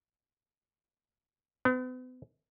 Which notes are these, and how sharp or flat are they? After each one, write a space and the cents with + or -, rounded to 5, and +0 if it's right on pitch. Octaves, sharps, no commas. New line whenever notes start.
B3 +45